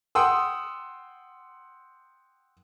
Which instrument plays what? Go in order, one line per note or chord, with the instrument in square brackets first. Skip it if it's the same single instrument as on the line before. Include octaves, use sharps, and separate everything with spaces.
[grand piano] F#5 G5 C6 D#6 E6